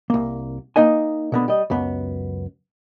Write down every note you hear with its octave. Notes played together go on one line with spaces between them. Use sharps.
C2 A#3
A#3 D#4 D#5 G#5
B2 D3 B3
G3 D#5
C#2 F#2 B3